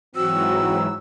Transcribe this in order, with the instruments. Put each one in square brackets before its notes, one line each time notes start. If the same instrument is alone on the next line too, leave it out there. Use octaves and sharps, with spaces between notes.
[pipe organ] G#2 E3 F#3 [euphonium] C4 [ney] F#4 [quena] E6